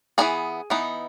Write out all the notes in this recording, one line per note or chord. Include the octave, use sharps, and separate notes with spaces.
E3 B3 D#4 G#4 G#5
E3 B3 D#4